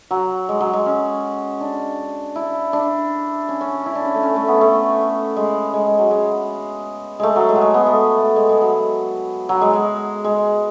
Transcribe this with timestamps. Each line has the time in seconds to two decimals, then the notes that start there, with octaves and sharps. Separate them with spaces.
0.11 F#3
0.49 G#3
0.61 F#3
0.73 G#3
0.86 C#4
1.61 D4
2.36 E4
2.73 D4
3.49 C#4
3.61 C#4
3.86 E4
3.95 D4
4.05 C#4
4.14 A3
4.23 C#4
4.36 A3
4.48 B3
4.61 A3
5.36 G#3
5.74 G#3
5.86 G#3
5.99 F#3
6.11 G#3
7.20 G#3 A3
7.36 F#3
7.49 G#3
7.56 F#3
7.61 G#3
7.74 B3
7.86 A3
8.18 A3
8.36 G#3
8.49 G#3
8.61 F#3
9.49 F#3
9.61 G#3
9.73 G#3
10.24 G#3